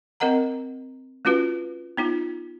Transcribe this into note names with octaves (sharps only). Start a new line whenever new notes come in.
C4 A#4 D#5 F#5 A#5
A3 C#4 F4 F#4 B4
B3 D#4 F4